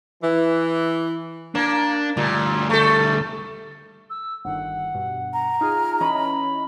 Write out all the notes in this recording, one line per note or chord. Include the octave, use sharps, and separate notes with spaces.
E3
A#3 D4
D2 A#2 G3
A3 A4
E6
G1 D#3 F#5
G2 B2
A#5
D#4 F4 G#4 F6
E3 C#4 D#5 B5